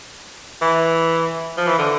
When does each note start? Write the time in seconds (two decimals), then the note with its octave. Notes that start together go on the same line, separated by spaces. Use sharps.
0.62 E3
1.57 F3
1.67 E3
1.79 D3